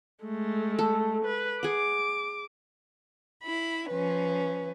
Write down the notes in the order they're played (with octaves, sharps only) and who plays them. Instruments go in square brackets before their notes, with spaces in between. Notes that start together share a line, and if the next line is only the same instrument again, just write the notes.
[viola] G#3 A3
[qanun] A4
[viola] B4
[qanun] G#4 F#5 [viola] D6
[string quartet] E4 B5
F3 C#4 B4